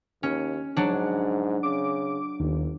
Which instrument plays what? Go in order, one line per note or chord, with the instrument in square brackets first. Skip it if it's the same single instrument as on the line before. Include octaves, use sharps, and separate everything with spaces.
[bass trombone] D#2 [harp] C#4
[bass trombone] G#2 [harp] F#3 D4
[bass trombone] C#3 [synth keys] D6
[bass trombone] G1 [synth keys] D#2